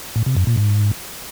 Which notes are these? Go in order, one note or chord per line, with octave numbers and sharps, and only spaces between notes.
A2
C3
F#2
A#2
G#2